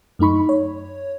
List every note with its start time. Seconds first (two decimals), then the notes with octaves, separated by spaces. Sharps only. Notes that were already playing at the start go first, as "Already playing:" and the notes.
0.19 F#2 A3 D#4 B5 C#6
0.49 C#5